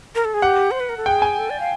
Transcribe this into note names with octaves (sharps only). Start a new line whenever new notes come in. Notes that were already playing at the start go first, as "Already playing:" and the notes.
A#4
A4
G#4
G4 F#5
C5
B4
A#4
A4
G#4 G5
G#5
A4
D5
F5